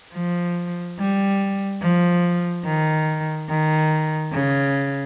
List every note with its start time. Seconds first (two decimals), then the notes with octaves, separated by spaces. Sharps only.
0.13 F3
0.98 G3
1.80 F3
2.64 D#3
3.48 D#3
4.33 C#3